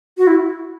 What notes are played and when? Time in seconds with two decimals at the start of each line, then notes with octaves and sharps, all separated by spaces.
0.18 F#4
0.27 E4